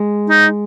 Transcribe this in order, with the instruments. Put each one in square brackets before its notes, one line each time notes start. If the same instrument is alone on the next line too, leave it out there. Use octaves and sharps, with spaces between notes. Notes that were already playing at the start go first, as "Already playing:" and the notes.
Already playing: [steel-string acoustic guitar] G#3
[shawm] D#4